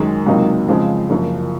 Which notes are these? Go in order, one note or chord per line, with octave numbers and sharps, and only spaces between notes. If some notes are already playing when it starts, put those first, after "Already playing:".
Already playing: F#2 D#3 G#3
C#2 C3 F#3 A#3 D#4
F2 C#3 F3 G#3 C4
F#1 F#2 F3